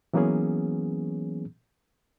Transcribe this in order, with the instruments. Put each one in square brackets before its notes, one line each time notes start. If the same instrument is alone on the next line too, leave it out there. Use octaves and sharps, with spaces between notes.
[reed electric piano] E3 F#3 A#3 B3 C#4 G#4